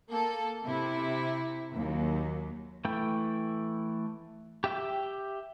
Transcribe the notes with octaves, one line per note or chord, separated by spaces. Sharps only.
A#3 A4
C3 E4
D#2 F#3
E3 A3 E4 G5
G4 E5 G5